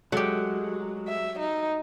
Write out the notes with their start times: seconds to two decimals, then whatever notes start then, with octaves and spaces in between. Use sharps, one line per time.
0.12 F#3 G#3 A3 G4
1.08 E5
1.39 D#4